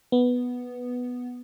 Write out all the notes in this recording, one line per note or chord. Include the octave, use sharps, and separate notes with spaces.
B3